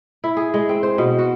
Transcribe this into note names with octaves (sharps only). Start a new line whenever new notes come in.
E4
G#4
G#3
C4
C5
B2
F#4